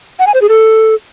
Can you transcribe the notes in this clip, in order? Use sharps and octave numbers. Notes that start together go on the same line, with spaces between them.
F#5
G#5
C5
G#4
A4